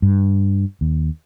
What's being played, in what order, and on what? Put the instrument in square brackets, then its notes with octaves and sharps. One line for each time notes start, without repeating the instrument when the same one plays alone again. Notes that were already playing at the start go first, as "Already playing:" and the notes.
[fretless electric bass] G2
D#2